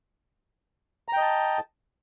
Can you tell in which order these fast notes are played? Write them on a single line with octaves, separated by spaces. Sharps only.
A#5 G5 D#5 A5